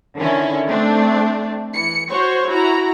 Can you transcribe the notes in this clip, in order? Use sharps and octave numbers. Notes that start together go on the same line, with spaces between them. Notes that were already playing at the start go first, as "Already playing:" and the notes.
D3 D#3 C#4 E4
A3 C4 D4
E3 C#7
F#4 C5 C#5 C#6
E4 F#4 A#5